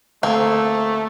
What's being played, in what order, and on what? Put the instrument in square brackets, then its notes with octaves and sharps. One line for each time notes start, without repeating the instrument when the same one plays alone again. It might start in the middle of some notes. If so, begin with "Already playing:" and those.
[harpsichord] D2 [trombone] A3 [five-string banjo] A#3 C4